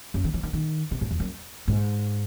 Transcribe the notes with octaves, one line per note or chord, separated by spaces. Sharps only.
F#2
D#3
E3
D#3
D#3
C3
G#2
E2
F#2
G#2